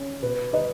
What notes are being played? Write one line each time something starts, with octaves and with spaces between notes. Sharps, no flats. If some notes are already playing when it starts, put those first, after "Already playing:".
Already playing: C#4
B2 B4
D#4 B4 D#5